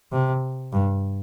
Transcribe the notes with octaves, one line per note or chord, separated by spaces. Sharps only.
C3
G2